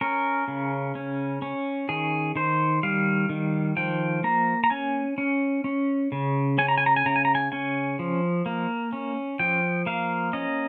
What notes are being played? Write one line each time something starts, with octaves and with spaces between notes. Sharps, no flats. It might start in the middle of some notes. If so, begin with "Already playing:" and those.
C#4 A#4
C#3
C#4
C#4
D#3 G#4
D#3 C5
G3 F5
D#3
F3 G5
A#3 A#5
A#5
C#4 G#5
C#4
C#4
C#3
C#4 G#5
A#5
G#5
A#5
G#5
C#3 A#5
G#5
A#5
G#5
C#4 G#5
F3
A#3
C#4
F3 G5
A#3 F5
C#4 D#5